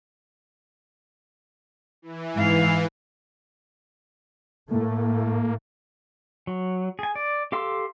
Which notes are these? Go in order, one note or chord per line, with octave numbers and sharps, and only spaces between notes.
E3
G#2 F5
A2 A3 A#3
F#3
G#4 G#5
D5
G4 A4 F5 C6 E6